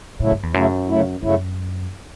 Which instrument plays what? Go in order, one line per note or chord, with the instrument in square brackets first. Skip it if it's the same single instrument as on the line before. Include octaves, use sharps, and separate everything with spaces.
[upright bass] A2 [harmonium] C#3 F#3 A3 E4
[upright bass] G2
E2
[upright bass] F#2 [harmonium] C#3 F#3 A3 E4
[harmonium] C#3 F#3 A3 E4
[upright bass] F#2 [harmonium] C#3 F#3 A3 E4